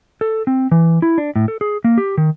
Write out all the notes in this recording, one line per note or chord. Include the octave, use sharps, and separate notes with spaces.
A4
C4
E3
E4
D4
A2
A4
G#4
A#3
G4
D#3